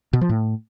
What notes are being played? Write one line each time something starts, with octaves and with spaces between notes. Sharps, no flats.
B2
F3
A2